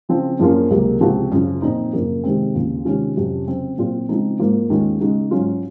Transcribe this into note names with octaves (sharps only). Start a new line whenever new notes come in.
C#3 F3 C4
F#2 F3 A#3 C#4 F4
C#2 C3 F#3 A#3
C#2 C3 F3 C4 F#4
F#2 C#3 F3
A#2 F3 C4 D#4
F#2 C#3 F3 A#3
C3 D#3 G#3 C4
D#2 C#3 F3
C3 D#3 G#3 C#4 F4
F2 C3 F#3 C#4 F#4
C#3 F#3 C4
A#2 F#3 C4 F4
C#3 F3 G#3 C4 D#4
G#2 F3 A#3 F4
D#2 D#3 G#3 C#4 F4
C#3 G#3 D#4 F#4
G#2 F#3 C#4 F4